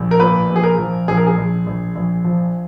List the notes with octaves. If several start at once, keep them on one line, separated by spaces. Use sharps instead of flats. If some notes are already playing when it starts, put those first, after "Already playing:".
Already playing: A#1
A#4
A#2 B4
A#1
G#4
A#4
F3
A#1 G#4
A#4
G#4
A#1
A#1
A#1
F3